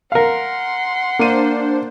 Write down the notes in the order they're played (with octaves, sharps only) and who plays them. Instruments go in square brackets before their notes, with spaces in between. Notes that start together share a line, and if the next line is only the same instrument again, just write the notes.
[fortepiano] A#4 F5 [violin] F#5 C6
[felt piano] A#3 D#7 [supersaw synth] D4 C5